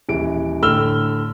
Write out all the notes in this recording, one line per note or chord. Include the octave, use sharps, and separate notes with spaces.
D#1 E3 D7
A2 D3 E6 F6 G7